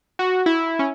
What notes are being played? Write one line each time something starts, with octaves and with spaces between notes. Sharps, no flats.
F#4
E4
C#4